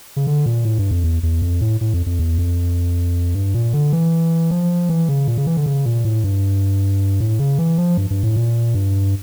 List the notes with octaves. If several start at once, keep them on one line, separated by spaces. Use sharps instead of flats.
C#3
D3
A#2
A2
G2
F2
E2
E2
F2
A2
A2
F2
F2
E2
F2
G2
A#2
D3
E3
F3
E3
C#3
A#2
C#3
E3
D3
C#3
A#2
A2
G2
A2
C#3
E3
F3
G2
G2
A2
A#2
G2